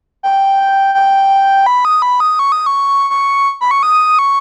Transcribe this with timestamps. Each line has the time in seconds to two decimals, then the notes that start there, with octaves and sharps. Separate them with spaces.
0.23 G5
0.95 G5
1.66 B5
1.85 D#6
2.02 B5
2.20 D#6
2.39 C#6
2.52 D#6
2.66 C#6
3.10 C#6
3.61 B5
3.71 C#6
3.83 D#6
4.19 C#6